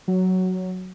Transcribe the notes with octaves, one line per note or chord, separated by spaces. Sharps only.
F#3